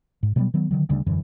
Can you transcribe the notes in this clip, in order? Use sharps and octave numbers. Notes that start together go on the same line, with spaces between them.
G#2
B2 F#3 G3 B3
D#3 F#3 B3
D3 D#3 F#3
D2 C#3 G3 D4
E1 F#2 D3 E3